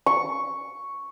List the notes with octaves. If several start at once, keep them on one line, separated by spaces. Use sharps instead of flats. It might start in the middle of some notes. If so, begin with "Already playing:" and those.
C#6